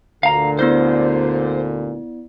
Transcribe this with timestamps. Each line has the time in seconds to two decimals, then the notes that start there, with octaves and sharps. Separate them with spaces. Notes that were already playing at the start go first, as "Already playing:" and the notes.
0.23 D2 A#2 D3 F5 A#5
0.59 B3 E4 C5 D5